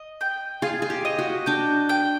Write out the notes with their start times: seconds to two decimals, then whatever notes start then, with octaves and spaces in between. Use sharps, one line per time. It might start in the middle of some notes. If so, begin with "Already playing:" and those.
Already playing: D#5
0.21 G5
0.62 F4 G#4
0.82 G#4
0.90 G4
1.05 D#5
1.19 F#4
1.46 D4 G5
1.89 G5